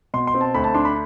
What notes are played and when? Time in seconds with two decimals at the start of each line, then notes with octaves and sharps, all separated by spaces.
0.14 B2 C6
0.27 C6
0.34 C4
0.41 A5
0.54 D2 B5
0.64 A5
0.74 D4 C6
0.85 B5